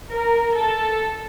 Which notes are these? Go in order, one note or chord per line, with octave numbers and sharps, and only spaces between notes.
A#4
A4